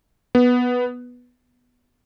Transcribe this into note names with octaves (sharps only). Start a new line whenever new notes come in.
B3